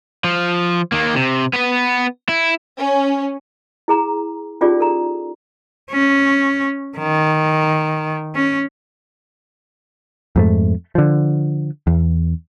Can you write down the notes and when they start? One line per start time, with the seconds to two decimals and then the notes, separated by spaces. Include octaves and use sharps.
0.24 F3
0.92 D#3 A#3
1.15 C3
1.53 B3 B4
2.29 E4
2.77 C#4
3.88 E4 G#4 A#5
4.61 C#4 D#4 F4 G4 G#4 D5
4.80 A4 A#5
5.92 C#4
6.98 D#3
8.35 C#4
10.36 F2 G#2 A3
10.95 D3 F3
11.87 E2